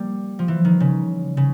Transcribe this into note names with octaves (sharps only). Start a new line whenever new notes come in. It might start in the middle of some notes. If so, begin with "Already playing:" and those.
Already playing: G3 A#3
F3
E3
D#3
C#3
C#3